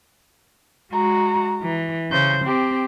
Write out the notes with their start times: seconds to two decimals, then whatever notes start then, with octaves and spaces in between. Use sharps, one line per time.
0.93 G#3 F#4 A#5
1.63 E3
2.11 C#3 C5 G6
2.46 C4 G4